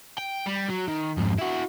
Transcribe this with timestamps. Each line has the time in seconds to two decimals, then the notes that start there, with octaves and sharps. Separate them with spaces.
0.18 G5
0.46 G3
0.70 F#3
0.88 D#3
1.17 F2 G#2
1.38 E4 F#4